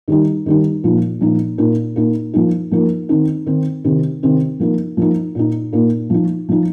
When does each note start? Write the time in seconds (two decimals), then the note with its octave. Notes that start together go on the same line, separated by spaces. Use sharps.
0.08 D#3 G3 D#4
0.46 D#3 G3 D#4
0.84 A#2 F3 D#4
1.21 A#2 F3 D#4
1.58 A#2 A#3 D#4
1.96 A#2 A#3 D#4
2.34 F3 A#3 D#4
2.71 F3 A#3 D#4
3.09 D#3 C4 D#4
3.46 D#3 C4 D#4
3.84 C3 D#3 C4
4.23 C3 D#3 C4
4.60 F3 A#3 D#4
4.97 F3 A#3 D#4
5.35 A#2 A#3 D#4
5.73 A#2 A#3 D#4
6.10 F3 D#4
6.49 F3 D#4